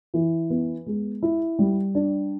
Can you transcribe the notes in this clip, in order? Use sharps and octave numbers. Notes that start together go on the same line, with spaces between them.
E3
B3
G#3
E4
G3
D4